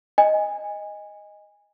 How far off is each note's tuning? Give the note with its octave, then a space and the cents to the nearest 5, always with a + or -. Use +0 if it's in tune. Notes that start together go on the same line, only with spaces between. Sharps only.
D#5 +0 G#5 -20